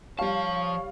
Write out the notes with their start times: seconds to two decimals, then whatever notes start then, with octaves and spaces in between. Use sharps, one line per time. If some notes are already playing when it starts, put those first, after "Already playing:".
0.19 F3 G3 C#5 F5 A5